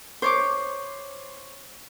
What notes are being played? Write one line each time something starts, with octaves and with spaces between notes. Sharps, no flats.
C5 C#5 D6